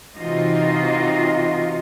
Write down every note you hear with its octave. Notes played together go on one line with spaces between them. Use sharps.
C3 E3 D#4 F4 F#4 D#5